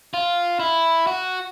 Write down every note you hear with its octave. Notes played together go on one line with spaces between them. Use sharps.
F4
E4
F#4